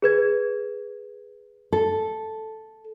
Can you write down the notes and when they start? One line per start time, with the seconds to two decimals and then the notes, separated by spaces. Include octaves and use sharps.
0.02 G#4 B4 G#6
1.72 A4